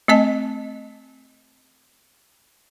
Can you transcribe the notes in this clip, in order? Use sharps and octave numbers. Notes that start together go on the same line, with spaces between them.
A3 C4 D#5 A5